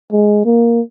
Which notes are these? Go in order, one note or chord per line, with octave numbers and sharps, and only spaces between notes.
G#3
A#3